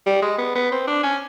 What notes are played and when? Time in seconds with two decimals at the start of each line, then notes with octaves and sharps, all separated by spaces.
0.06 G3
0.22 G#3
0.38 B3
0.55 B3
0.72 C4
0.87 D4
1.03 C#4